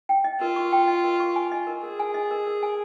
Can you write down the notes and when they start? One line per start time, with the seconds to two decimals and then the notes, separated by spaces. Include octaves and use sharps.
0.09 G5
0.24 D#5
0.40 F4 A#4
0.56 C#6
0.73 G5
0.88 D#5
1.04 A#4
1.20 C#6
1.36 G#5
1.52 D#5
1.67 A#4
1.83 G#4 A#4
1.99 G#5
2.14 D#5
2.31 A#4
2.47 A#4
2.63 G#5